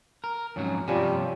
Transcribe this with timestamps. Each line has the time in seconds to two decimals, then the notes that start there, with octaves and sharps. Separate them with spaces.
0.24 A#4
0.56 F2 G#2 F#3 C#4
0.88 G2 C3 F3 G3 C#5 G#5